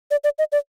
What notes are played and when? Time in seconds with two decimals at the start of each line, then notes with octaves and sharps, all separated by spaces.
0.11 D5
0.24 D5
0.39 D#5
0.52 D5